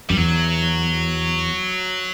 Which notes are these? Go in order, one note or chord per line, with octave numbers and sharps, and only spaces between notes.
F#2 G3
E2 F#3